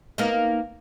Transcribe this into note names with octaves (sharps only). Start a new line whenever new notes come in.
A#3 B3 D#4